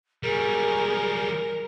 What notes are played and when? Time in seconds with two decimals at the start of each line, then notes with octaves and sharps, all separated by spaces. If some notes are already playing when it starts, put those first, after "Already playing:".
0.23 F#3 G3 G#4 A#4